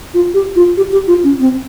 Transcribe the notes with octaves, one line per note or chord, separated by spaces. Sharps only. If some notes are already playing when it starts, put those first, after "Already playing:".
F4
G4
F4
G4
G4
F4
C#4
C4